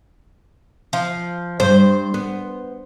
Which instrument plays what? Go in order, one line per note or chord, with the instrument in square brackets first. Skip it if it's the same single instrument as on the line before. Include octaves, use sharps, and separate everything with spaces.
[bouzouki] F3
[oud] G2 [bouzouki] C5
[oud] B3